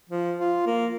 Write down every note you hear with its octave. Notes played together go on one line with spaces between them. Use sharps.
F3
F4
A#3